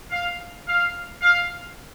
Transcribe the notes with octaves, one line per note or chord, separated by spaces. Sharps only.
F5
F5
F5